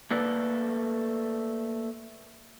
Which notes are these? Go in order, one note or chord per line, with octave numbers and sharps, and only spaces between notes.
A3 A#3 A4 B4 D5